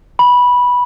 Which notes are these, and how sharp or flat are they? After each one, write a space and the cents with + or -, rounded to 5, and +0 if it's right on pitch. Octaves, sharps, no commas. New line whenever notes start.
B5 -10